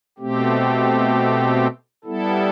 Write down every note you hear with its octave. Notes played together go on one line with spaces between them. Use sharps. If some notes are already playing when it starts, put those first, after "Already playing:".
B2 A3 C4 G4
G3 B3 E4 A4